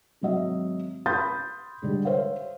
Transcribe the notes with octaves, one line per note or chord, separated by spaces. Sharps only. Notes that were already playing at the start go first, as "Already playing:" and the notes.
G#1 F#3 D#5 E5
B5 C6 D#6 G6 A6
G#2 D3 G3
C5 C#5 E5 F5